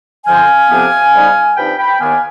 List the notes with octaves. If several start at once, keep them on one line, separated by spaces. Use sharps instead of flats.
F2 D3 F3 C4 F5 G#5
F2 C3 F3 B3 D4
G#2 G3 B3 D#4
G2 F3 C4 D#4 G5 B5
G5 B5
D#2 D#3 B3 D4 F5 G#5